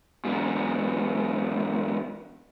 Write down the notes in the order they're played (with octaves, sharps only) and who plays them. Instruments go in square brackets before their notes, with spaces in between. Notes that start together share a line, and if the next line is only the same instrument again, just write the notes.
[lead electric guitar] E2 G#2